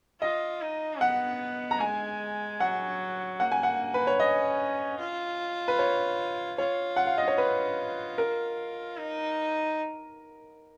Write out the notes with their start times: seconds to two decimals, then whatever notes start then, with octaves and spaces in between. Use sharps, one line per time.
0.21 F4 D#5
0.62 D#4
1.01 B3 F#5
1.71 A#5
1.80 G#3 G#5
2.60 F#3 F#5
3.40 A#3 F#5
3.52 G#5
3.63 F#5
3.94 B4
4.07 C#5
4.19 C#4 D#5
4.99 F4
5.68 B4
5.79 C#5
6.58 F4 C#5
6.96 F#5
7.07 F5
7.18 D#5
7.28 C#5
7.38 F4 B4
8.18 A#4
8.97 D#4